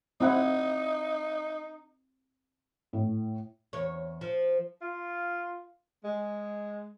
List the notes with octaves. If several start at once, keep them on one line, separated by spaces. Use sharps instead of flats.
C4 D#4 E4 F#5
A2
E2 C#5
F3
F4
G#3